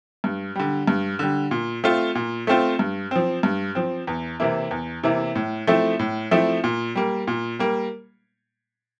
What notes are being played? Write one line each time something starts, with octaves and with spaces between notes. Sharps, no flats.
G2
D3 G3
G2
D3 G3
A#2
A3 C4 F4
A#2
A3 C4 F4
G2
F3 C4
G2
F3 C4
E2
C3 E3 A#3 E4
E2
C3 E3 A#3 E4
A2
F3 A3 C4 E4
A2
F3 A3 C4 E4
A#2
G3 A#3
A#2
G3 A#3